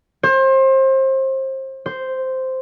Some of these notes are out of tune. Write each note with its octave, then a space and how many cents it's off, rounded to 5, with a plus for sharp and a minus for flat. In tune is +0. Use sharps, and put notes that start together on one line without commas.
C5 +30
C5 -5